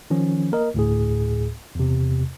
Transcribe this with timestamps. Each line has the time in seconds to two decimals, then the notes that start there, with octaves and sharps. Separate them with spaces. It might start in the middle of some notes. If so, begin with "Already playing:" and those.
0.10 D#3 F3 C#4
0.52 A#3 A#4 D#5
0.74 D2 A2 G#4
1.75 E2 C3